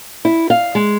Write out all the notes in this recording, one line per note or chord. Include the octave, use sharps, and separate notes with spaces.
E4
F5
G#3